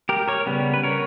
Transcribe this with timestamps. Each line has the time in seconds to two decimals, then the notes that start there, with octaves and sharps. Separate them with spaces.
0.09 G4 A#4
0.28 A#4 C#5
0.46 C#3 G3 B3
0.74 B4
0.83 A#4 C#5